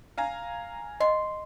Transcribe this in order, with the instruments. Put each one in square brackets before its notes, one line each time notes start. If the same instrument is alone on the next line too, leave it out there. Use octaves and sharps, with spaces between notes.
[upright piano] F5 G#5 A#5
[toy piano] D#5 [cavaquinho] C6